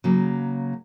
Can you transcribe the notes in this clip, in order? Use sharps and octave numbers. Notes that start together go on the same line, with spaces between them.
C#3 F#3 A#3